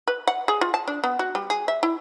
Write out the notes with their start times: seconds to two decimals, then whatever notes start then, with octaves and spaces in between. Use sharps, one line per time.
0.08 B4
0.27 F#5
0.48 G#4
0.61 F4
0.74 A5
0.88 D4
1.04 B3
1.19 F#4
1.35 G3
1.50 G#4
1.68 E5
1.83 E4